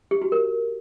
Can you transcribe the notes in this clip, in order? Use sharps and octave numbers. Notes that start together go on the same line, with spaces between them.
G4
F#4
A#4